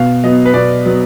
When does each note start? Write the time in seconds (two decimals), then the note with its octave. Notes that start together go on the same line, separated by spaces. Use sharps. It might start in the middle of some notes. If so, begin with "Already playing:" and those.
Already playing: B2 F5
0.23 F#3 B3 D#5
0.45 B4
0.54 B2 D5
0.85 F#3 B3